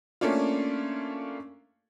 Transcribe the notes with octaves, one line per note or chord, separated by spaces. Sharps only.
A3 A#3 C#4 D4 F4